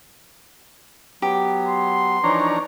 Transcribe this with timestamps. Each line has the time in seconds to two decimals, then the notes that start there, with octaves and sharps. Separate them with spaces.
1.22 F#3 B3 G4
1.68 C6
2.24 E3 F3 D4 D#4 C#5 A#5